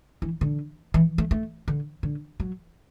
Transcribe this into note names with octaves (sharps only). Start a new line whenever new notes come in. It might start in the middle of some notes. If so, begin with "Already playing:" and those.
E3
D3
E3
A3
A3
D3
D3
F#3